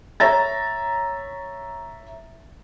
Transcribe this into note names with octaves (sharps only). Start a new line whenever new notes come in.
C#5 E5 A#5 A6